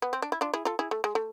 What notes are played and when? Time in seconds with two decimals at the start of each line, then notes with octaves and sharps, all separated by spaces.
0.02 B3
0.13 C4
0.22 D4
0.32 E4
0.41 D4 F4
0.54 E4 G#4
0.65 F4 A4
0.79 E4 G#4
0.91 A3
1.04 G#3
1.15 A3